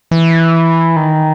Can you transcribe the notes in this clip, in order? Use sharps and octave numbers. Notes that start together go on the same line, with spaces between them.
E3
D#3